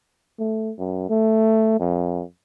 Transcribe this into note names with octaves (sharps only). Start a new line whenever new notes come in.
A3
F#2
A3
F2